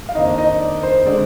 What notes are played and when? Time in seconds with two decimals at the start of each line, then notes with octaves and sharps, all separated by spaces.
0.09 F5
0.15 F2 D#3 A#3 D4 D#4 D#5
0.38 D#4 D#5
0.61 D5
0.83 C5
1.05 D3 G#3 C4 D5